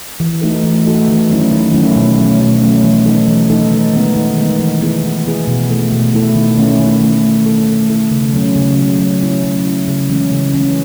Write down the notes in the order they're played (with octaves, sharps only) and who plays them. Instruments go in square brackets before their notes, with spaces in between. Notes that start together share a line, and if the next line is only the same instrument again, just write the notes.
[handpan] E3
A3 D#4 F#4 A4
E3
A3 D#4 F#4 A4
D#3
F#3 A3 C#4 E4
D#3
F#3 A3 C#4 E4
B2
F#3 A3 C#4
B2
F#3 A3 C#4
E3
A3 D#4 A4
E3
A3 D#4 A4
D#3
G#3 B3
D#3
G#3 B3
E3
B3 E4 G#4
E3
B3 E4 G#4
B2
A3 E4 A4
B2
A3 E4 A4
D#3
A3 C#4 E4
D#3
A3 C#4 E4
A3
E4 A4
A3
E4 A4
C#3
F#3 C#4
C#3
F#3 C#4
F#3
C#4 E4
F#3
C#4 E4
C#3
E3 G#3 C#4
C#3
E3 G#3 C#4